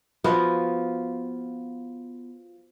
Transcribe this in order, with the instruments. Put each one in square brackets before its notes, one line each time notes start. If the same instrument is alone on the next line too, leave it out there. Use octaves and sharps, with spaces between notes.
[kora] F3 B3 F4 F#4